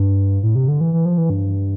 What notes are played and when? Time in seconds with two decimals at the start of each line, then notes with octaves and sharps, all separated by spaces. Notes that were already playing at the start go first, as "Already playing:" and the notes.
Already playing: G2
0.43 A2
0.55 C3
0.68 D3
0.81 E3
0.93 E3
1.05 F3
1.18 E3
1.30 G2